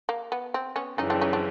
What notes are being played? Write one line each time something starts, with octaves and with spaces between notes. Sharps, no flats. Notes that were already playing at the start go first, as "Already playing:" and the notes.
A#3
B3
C4
B3 C#4
F#2 C#3 E3 G3 C#4 D#4
C4 D4
C#4 D#4
C4 D4